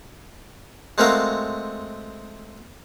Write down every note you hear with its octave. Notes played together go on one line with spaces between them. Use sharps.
G#3 A3 C4 F#4 A#4 F5